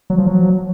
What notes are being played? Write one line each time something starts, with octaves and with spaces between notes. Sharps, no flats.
F#3
F3
F#3